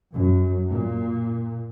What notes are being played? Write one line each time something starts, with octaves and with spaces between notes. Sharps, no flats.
F#2
A#2